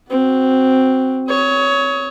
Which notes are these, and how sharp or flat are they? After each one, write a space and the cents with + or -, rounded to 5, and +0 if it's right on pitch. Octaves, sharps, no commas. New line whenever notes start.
C4 +0 F#4 +0
C#5 +15 D#6 +35